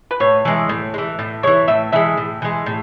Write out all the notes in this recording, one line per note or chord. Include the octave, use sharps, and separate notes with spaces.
B4
A2 C#5
E3 G#3
A2
G#3
E3
A2
E3 G#3 C#5
A2 E5
E3 G#3 E5
A2
E3 G#3
A2